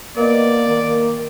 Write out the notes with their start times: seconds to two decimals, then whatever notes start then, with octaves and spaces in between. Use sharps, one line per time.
0.17 A#3 B3 A#4 D5 D#5
0.68 D#3 A#3